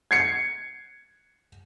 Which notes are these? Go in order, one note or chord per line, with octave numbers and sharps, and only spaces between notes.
G#6 C7 C#7